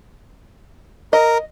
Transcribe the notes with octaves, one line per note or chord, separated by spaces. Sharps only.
A#4 D#5